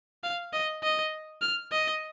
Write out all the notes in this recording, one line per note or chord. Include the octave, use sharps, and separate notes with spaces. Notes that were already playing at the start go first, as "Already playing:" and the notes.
F5
D#5
D#5
F6
D#5